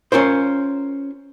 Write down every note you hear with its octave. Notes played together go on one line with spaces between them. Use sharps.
C#4 F4 A#4 C5